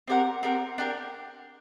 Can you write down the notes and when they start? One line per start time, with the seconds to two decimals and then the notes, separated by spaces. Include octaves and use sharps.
0.07 C4 G4 A#4 F#5
0.43 C4 G4 A#4 F#5
0.78 D4 G4 A#4